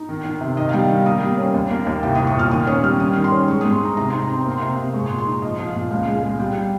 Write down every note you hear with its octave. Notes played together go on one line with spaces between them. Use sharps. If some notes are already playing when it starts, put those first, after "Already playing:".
Already playing: D#4
D#3
D#3
C3
D#3 D#5
F5
G3 G5
D#3
A#3 D#6
G3
C#4
D#2
A#3
D#2
C2 G5
C2 D#6
C#6
A#2 F6
D#3 D#6
C#4 C#6
G3 F6
D#3 D#6
D#3
C6
C#4
G#3 C#6
G#2 D#6
C6
D#4 A#5
C3 A#5
D#4 C6
A#5
C4 C6
A#3 A#5
C6
C3 A#5
C3
G#3 C#6
C6
A#2
C6
D#4
F3 D#5
F3
F5
A#2
C#2 F5
G#3
F5
G#3
G3 G5
G5